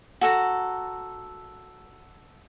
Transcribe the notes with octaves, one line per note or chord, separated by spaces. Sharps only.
F#4 A4 A#5